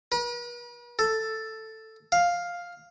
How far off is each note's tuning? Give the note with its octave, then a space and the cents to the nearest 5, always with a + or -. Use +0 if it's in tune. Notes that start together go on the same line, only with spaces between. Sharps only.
B4 -45
A4 +5
F5 +5